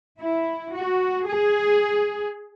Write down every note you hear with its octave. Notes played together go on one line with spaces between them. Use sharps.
E4
F#4
G#4